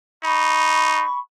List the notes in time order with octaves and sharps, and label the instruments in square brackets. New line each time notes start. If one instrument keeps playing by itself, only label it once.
[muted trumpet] D#4 [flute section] B5 C#6